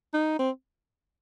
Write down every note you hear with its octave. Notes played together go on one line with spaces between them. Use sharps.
D#4
C4